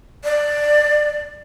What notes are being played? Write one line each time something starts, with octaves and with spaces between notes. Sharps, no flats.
D5